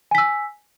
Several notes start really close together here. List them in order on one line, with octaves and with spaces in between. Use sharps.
G#5 B6 E6